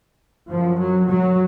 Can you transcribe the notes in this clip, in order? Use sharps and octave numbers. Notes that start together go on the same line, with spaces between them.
F#2 F3
F#3
F#3